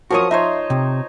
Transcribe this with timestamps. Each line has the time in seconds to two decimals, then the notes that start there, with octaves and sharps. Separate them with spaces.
0.11 F3 F#4 A#4 C#5 D#6
0.31 D#4 C5 C#5 E5
0.70 C3